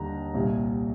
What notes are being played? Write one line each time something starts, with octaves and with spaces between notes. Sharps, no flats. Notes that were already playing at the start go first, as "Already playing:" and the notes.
Already playing: D#2 D3 G3 A#5
C2 A#2 G3